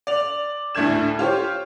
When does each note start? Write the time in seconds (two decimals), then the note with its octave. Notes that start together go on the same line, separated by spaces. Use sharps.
0.07 D5 F7
0.75 D2 A2 A3 D4 G#6 E7
1.19 F4 G4 C5 C#5